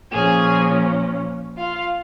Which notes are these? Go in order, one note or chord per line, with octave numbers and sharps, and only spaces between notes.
A#2 F3 C#4 G#4 G#5
F4 F5